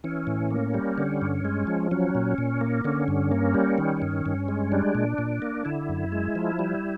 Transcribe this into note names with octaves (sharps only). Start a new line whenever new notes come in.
E3 C#4
A2
A#3
G3
D3
G2
G#3
F3
F#3 C#4
A#2
A#2
A#3
D3 C#4
G2
A#3
G3
D#3
G2
G2
G#3
G3 D4
A#2
A#2
A#3
D3 E4
F#2
G#3
F3
G3